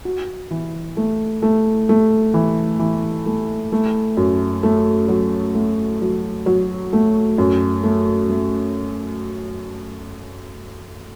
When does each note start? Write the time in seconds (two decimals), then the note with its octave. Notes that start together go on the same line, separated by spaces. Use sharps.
0.05 F#4
0.51 E3
0.97 A3
1.42 A3
1.89 A3
2.34 E3
2.79 E3
3.26 A3
3.72 A3
4.17 F#2
4.63 A3
5.08 F#3
5.54 A3
6.01 F#3
6.46 F#3
6.93 A3
7.38 F#2
7.83 A3
8.30 A3